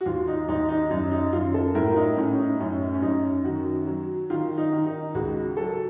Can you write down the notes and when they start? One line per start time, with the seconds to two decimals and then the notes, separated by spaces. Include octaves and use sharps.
0.01 F#4
0.06 D#2 F4
0.27 D#4
0.48 D#2 D#4
0.69 D#4
0.90 F#2 D#4
1.12 D#4
1.33 F#2 F4
1.54 A4
1.75 A2 A#4
1.91 F4
1.96 D#4
2.17 A2 C#4
2.39 D#4
2.60 F#2 C#4
2.94 C#4
3.02 F#2 D#4
3.44 D#3 F#4
3.87 F#3
4.30 D#3 F4
4.58 D#4
4.72 D#3
4.86 D#4
5.15 C#2 F#4
5.57 F#3 A4